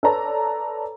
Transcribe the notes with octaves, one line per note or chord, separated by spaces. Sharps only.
A4 B4 C#5 D5 A5 A#5